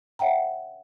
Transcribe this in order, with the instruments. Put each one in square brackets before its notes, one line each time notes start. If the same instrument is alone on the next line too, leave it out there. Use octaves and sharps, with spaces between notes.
[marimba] C#5 E5 F#5 G5 A#5